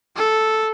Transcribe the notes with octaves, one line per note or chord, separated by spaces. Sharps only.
A4